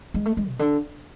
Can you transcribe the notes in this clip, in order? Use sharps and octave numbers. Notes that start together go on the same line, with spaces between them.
G#3
A3
G#3
B2
D3